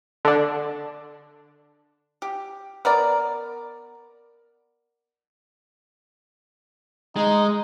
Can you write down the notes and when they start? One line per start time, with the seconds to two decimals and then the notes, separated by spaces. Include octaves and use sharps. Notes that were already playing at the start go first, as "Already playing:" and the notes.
0.25 D3 D4
2.22 G4
2.85 B3 A#4 D5
7.16 G#3 D#4